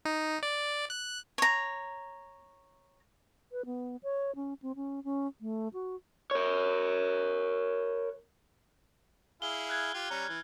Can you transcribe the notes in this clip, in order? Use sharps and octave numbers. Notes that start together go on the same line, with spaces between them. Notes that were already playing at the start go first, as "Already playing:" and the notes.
D#4
D5
F#6
C#5 A#5
B4
B3
C#5
C#4
C4
C#4
C#4
A3
F#4
A#4 C#5
E4 G#4 F5 G7
F6 F#6 G#6
F4 G4
G3 C#4 A#5
E3